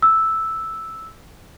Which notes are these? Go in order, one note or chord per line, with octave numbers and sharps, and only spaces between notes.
E6